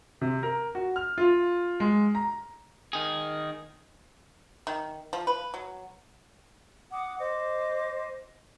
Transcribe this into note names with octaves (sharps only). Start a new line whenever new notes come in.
C3
A#4
F#4
F6
F4
G#3
A#5
D#3 G#4
D#3
F3
B4
F#3
F#5 D6 D#6
C5 D#5 D6